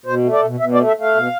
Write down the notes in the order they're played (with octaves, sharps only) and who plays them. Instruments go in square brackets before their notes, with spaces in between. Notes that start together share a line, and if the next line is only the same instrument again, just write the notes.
[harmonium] B2 C5
A3
D5
B2
B2 E5
D5
A3
E5
A3 F5
B2